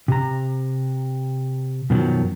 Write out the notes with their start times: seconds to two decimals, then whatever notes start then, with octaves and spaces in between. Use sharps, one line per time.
0.08 C3 A#5
1.90 F#2 B2 D#3 F3 F#3